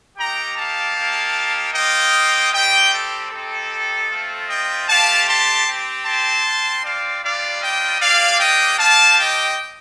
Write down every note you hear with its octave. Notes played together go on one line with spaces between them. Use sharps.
A#3 D#4 G4 G5 A#5
F5 A5
A#3 D#4 G4
A#3 F4 D#5 G5
G3 C4 G4 D#5 G5
A4
C4 D#4 G4 A4
A3 C4 F4
D#5 G5
A3 C4 G4 F5 A5
A5 C6
C4 G4
A5 C6
C4 F4
D5 F5
G3 D4 F4 D5 F5
D#5 G5
A#3 D4 G4 D5 F5
D#5 G5
C4 G4 F5 A5
D#5 G5